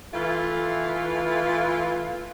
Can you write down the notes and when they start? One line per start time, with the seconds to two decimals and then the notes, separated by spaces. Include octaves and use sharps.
0.13 E3 A3 F4